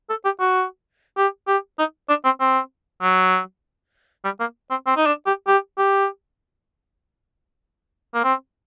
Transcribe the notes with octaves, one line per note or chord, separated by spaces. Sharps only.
A4
G4
F#4
G4
G4
D#4
D4
C4
C4
F#3
G3
A#3
C4
C4
D#4
D4
G4
G4
G4
A#3
C4